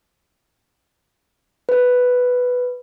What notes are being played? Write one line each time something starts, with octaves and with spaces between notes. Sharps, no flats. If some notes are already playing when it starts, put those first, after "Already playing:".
B4